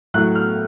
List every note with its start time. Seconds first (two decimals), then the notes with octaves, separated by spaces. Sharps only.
0.14 A2 F#3 A3 F#6
0.35 F6